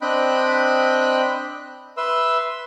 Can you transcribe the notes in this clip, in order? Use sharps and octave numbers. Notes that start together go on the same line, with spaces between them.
C4 D4 D#5 G5 B5 F#6
B4 E5 C6 E6